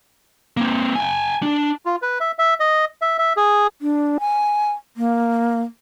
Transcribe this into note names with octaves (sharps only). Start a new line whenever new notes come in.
A#3 C4
G5 G#5
D4
F4
B4
E5
E5
D#5
E5
E5
G#4
D4
G#5
A#3